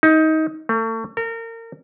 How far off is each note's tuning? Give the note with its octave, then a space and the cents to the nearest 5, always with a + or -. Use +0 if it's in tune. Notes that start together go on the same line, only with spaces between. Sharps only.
D#4 +20
A3 +35
A#4 -30